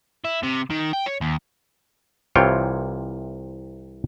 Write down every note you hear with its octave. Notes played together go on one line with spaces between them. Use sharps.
E4
C3
D#3
G5
C#5
D#2
C2 C3 E3 F4 C#5 G5